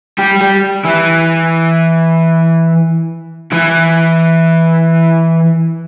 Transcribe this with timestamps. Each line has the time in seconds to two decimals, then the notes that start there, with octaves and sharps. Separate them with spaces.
0.18 G3 G4
0.41 G3 G4
0.84 E3 E4
3.52 E3 E4